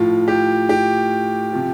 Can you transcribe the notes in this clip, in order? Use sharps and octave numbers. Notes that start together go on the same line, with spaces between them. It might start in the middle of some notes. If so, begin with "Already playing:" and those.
Already playing: A2 F3 F4
G4
G4
C3 F3